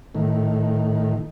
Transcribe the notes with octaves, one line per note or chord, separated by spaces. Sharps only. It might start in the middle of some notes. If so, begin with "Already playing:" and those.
A2 D#3